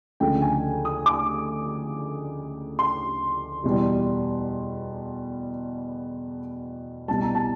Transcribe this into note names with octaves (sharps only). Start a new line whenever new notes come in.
D2 C#3 F3 G#3 G5
G#5
D#6
D6
C6
E2 B2 G3
C2 B2 G3 A5
A#5
A5